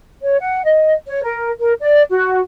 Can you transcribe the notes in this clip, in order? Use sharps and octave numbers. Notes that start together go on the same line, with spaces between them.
C#5
F#5
D#5
C#5
A#4
A#4
D5
F#4